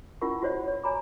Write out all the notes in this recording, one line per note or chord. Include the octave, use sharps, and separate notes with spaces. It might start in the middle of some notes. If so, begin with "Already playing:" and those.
C#4 E4 F4 A#4 F#5 C#6
F4 F#4 C5 C#5 D#5 F#5
C#5
C#5 G#5 A#5 B5 D6